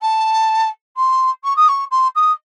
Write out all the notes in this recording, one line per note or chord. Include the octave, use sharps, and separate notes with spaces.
A5
C6
C#6
D#6
C#6
C6
D#6